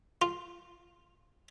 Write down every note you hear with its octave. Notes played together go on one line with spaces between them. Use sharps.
F4